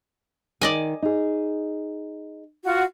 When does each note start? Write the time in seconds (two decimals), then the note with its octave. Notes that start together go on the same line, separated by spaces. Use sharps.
0.61 D#3 D5 D#5 G#5
1.02 D#4 G#4
2.64 F4 F#4